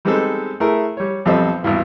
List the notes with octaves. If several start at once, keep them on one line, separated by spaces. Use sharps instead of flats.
G3 G#3 B3 C4 D#4 A4
A3 E4 G#4 A#4
G3 C#5
B1 F2 G3 C4 A4 D#5
G#1 E2 G2 E3